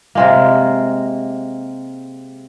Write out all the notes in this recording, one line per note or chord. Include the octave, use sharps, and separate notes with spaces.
C3 G#3 A#3